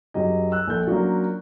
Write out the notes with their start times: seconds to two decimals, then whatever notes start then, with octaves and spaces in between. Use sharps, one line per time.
0.14 F#2 F#3 G4 G#4 D#5
0.52 E6 F#6
0.67 A#1 A4 G6
0.87 F#3 A#3 C#4 D4 F4 F#4